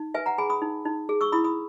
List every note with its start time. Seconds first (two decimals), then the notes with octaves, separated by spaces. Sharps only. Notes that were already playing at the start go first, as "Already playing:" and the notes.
Already playing: D#4
0.14 B4 E5 G#5
0.26 F#5 A#5
0.38 G#4 G#5 B5
0.50 B5 D#6
0.62 D#4
0.85 D#4
1.09 G#4
1.21 C#6 E6
1.32 E4 B5 D#6
1.44 B5 D#6